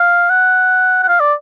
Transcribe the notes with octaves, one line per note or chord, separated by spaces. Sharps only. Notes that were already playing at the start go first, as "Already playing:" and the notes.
Already playing: F5
F#5
F#5
F5
D5